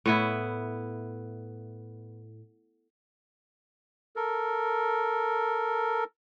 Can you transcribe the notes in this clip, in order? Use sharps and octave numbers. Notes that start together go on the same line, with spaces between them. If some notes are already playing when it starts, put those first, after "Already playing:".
A2 B3 E4
A4 A#4